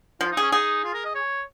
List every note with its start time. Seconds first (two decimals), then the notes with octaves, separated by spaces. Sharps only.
0.21 F3 F4
0.32 D#4
0.37 C#4 G#4
0.52 D#4 G#4
0.84 F4
0.94 A#4
1.05 D#5
1.15 C#5